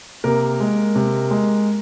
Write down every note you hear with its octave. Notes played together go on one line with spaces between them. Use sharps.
C3 A#3 A#4
G#3
C3
G#3